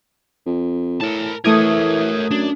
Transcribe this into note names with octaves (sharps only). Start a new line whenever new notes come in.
F2
A2 A#4 A5
E3 A3 A#4 C#5 D#6 G#6
F#2 D4